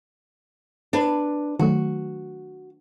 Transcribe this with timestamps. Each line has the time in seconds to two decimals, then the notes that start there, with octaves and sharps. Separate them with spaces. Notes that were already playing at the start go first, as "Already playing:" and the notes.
0.93 D4 B4
1.59 D#3 F#3 A3 F#4